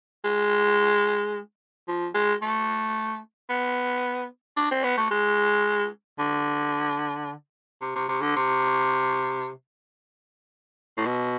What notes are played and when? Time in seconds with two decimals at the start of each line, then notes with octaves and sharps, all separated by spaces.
0.25 G#3
1.88 F3
2.15 G#3
2.42 A3
3.49 B3
4.57 D4
4.71 C4
4.84 B3
4.97 A3
5.11 G#3
6.19 D3
7.81 C3
7.95 C3
8.08 C3
8.21 D3
8.36 C3
10.97 A2
11.06 B2